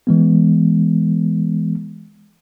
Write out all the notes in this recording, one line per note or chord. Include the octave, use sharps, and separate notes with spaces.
E3 G#3 B3